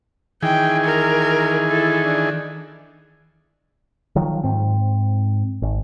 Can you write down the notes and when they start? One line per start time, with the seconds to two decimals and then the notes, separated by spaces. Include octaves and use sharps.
0.43 D#3 E3 G#4 G5
0.85 A#4
1.69 E4 A4
2.05 D4
4.16 D#3 F3 F#3
4.44 G#2 C4
5.62 G#1